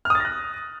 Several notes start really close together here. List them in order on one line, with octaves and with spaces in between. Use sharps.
F6 D#6 A6 A#6 F#6